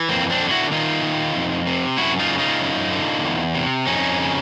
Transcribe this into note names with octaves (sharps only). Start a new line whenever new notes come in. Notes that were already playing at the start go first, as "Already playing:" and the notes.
Already playing: E3
F2 A#3 C4
C4 D4
D3
E4 F#4
D#3 D#4 F4
D#3
F2
C3
F#2 E4 F#4
D#4 F4
C#3
D#4 F4
F#2
D3
E2
C3
F2 C#4 D#4
C#3